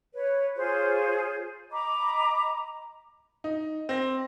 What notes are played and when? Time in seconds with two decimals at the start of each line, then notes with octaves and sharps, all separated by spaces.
0.13 B4 C#5
0.56 F4 G#4 C5 C#5
1.71 D#5 A#5 B5 D6
3.44 D#4
3.89 C4 A#6